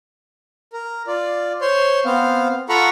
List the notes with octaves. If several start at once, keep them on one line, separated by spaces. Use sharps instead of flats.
A#4
F4 D5
C5 C#5 C6
B3 C4 F5
F4 A4 F#5 A#5 B5 C#6